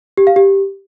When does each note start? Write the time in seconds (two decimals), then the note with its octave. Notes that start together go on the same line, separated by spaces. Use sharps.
0.17 G4
0.27 F5
0.36 G4